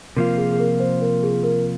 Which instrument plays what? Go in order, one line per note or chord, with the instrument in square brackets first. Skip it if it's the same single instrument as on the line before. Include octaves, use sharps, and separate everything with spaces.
[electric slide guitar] C3 F3 A#3 F4 [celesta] A#4
[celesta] G#4
G#4
A#4
C5
A#4
G#4
A#4